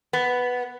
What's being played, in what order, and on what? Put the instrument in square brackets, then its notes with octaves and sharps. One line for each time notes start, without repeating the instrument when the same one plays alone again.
[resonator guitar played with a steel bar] B3